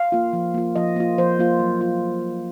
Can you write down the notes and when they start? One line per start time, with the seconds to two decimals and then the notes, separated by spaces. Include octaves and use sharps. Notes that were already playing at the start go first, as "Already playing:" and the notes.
Already playing: F5
0.12 A#3 F4
0.33 F3
0.54 A#3 F4
0.76 F3 D#5
0.96 A#3 F4
1.18 F3 C5
1.39 A#3 F4
1.60 F#3
1.81 F4